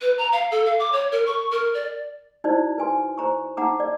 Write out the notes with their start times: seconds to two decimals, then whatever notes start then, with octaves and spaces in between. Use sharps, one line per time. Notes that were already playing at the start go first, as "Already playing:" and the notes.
0.02 B4
0.18 A#5
0.32 F5
0.51 A4
0.66 F5
0.79 D6
0.92 C#5
1.12 A#4
1.26 C#6
1.51 A#4
1.74 D5
2.44 D#4 E4 F#4 C5 D5
2.78 B4 G#5 C6
3.18 C5 A#5 C#6
3.57 D#4 F#5 A#5 D6
3.80 D5